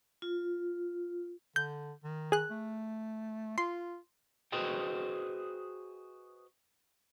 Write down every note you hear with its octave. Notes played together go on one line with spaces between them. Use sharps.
F4
D3 G6
D#3
G#4 F#6
A3
F4 C6
F#4 G#4 B4 C5 D#5 G5